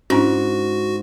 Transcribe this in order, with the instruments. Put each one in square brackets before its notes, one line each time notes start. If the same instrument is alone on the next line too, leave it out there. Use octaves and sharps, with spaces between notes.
[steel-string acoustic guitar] G#2 [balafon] C#4 D4 E4 [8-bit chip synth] F#4